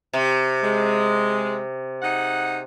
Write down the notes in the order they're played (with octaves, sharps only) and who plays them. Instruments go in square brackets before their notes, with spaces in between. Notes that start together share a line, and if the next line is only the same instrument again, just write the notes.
[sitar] C3
[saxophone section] G#3
D#4 G#4 F#5